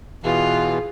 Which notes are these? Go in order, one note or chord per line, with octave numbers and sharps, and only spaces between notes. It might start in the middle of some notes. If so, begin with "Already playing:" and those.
B2 E3 F4 G#4